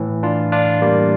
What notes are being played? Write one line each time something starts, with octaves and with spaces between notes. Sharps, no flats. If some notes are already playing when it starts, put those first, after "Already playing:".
Already playing: A2 E3
D4 F4
D4 F4
G3 A#3